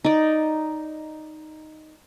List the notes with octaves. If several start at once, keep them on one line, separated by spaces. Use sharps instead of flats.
D#4 D5